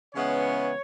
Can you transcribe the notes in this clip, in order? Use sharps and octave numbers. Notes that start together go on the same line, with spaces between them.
C#3 E3 G#3 B3 C#5